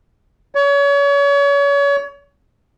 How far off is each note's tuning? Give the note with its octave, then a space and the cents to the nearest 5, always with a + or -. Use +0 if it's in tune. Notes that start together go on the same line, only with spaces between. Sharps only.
C#5 +35